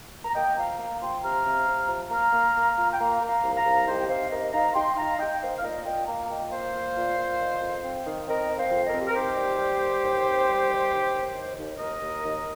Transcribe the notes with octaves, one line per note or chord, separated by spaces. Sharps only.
A#5
A#3 D#5 G5
F3 F5 A#5
A#3 F5 A#5
F3 G5 C6
C3 F5 A#5
C3
C3
F3
A#3 F5 A#5
A#3
A#3
F4
G5
A#3 F5 A#5
A#3
F5 A#5
C2
F5 A#5
C2
D#4 G4 C5
G5
C3 C5 F5
D#4 A#4 D#5
D#4 F5 A#5
D#4 G5 C6
D#4 F5 A#5
D#4 D#5 G5
A#3 C5 F5
F5
A#2 A#4 D#5
F4 D#5 G5
A#3 F5 A#5
A#2 D#5 G5
A#3 C5 F5
A#2
A#2
A#2
D#3
F2
C4
D#3
C4 A#4 D#5
C4
C5 F5
F2
A#4 D#5
C4
G4
A#4
D#3 G4 C5
G3
G3
D#2
D#2
C4
G3
D#3
D#2
D#2
D#3
D#2
D#2 A#4 D#5
D#2
D#2